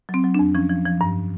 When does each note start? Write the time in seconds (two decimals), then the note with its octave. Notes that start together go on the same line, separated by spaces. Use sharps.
0.09 F#3
0.14 C4
0.24 F#3
0.34 F2 D4
0.55 F3 C#4
0.70 F3
0.86 F3
1.01 G2